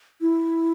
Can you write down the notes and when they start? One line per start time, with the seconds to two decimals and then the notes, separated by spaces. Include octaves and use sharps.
0.21 E4